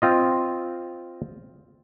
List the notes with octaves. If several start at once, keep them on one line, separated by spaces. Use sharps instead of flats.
C4 F4 D#5